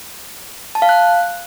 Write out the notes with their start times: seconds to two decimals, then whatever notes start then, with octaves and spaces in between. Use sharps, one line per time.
0.75 A5
0.82 F5
0.89 F#6